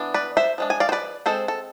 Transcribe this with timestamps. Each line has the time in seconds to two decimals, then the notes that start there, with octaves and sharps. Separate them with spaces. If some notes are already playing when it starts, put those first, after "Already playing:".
Already playing: E3 B3 D4
0.14 B4 D5
0.37 C5 E5
0.58 F3 G#3 D4
0.70 G#5
0.80 D5 F5
0.89 C5
0.92 B4 D5
1.26 G#3 C4 A4 C5
1.48 A4